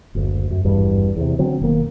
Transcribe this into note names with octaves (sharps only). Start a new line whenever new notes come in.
F#1 D2
F#2
G#1 E2 G2
E2 C3
D3 F#3 C4 C#4
F1 B2 D#3 A#3